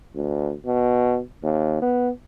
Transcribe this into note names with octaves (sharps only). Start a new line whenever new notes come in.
D2
B2
D#2
B3